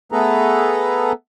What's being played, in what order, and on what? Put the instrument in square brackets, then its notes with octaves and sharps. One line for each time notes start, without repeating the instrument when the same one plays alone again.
[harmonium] A3 B3 G#4 A4 B4 A#5